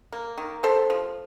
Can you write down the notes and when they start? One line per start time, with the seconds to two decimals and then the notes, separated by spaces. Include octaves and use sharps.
0.12 A#3
0.38 D#3
0.63 C3 A4 C5
0.90 F3